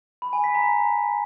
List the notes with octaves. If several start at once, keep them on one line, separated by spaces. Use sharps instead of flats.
B5
G#5
B6
A#5